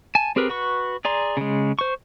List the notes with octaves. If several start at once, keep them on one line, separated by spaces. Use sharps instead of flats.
G#5 A5
C4 G4 G#4 A#4 B4
F#4 B4 C#6
G#4 D5 A#5 C6
C#3 G#3
C5 C#6